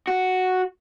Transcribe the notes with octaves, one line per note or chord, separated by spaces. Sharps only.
F#4